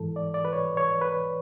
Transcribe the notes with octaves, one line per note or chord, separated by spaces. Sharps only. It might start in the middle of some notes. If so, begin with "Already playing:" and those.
Already playing: G#2 E3 A4
D5
D5
B4
C#5
C#5
B4